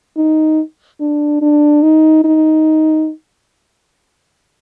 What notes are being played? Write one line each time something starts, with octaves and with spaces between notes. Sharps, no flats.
D#4
D4
D4
D#4
D#4